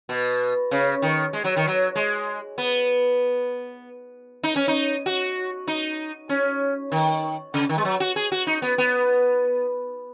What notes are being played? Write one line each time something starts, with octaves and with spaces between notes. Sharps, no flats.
B2
C#3
D#3
G#3
F#3
D#3
F#3
G#3
B3
D#4
C#4
D#4
F#4
D#4
C#4
D#3
C#3
D#3
G#3
F#3
F#4
G#4
F#4
D#4
B3
B3